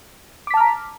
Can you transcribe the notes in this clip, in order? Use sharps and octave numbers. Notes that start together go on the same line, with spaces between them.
A5 A#5 D6 F6 B6